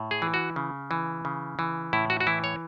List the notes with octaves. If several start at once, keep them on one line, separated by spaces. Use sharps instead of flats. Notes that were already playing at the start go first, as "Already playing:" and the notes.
Already playing: A2
G#4
E3
F#4
C#3
E3
C#3
E3
A2 E4
F#4
F#4
E3 E4
C#5